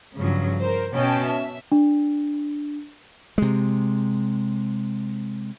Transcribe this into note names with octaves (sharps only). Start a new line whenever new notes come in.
G2 C#3 F3 F#3
A#4 C5
B2 C#4 G5 A5
E5
D4
C3 G#3